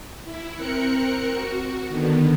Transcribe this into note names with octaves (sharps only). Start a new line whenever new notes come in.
E4
C4 A#4 F#6 C#7
F#4
D3 D#3 B3